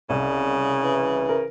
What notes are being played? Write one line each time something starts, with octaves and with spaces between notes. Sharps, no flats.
C2 C#3
E3
A#4